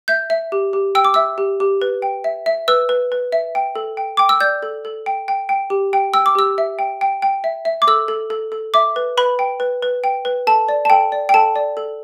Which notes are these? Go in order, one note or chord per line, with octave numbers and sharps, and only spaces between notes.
E5 G6
E5
G4
G4
G5 E6
D6
E5 E6
G4
G4
B4
G5
E5
E5
B4 E6
B4
B4
E5
G5
A4
G5
G5 D6
E6
D5 G6
A4
A4
G5
G5
G5
G4
G5
G5 E6
D6
G4 E6
E5
G5
G5
G5
E5
E5
D6
A4 E6
A4
A4
A4
E5 D6
B4
B4 B5
G5
B4
B4
G5
B4
A4 A5
D5
A5
A4 G5
D5
G5
A4 A5
D5
A4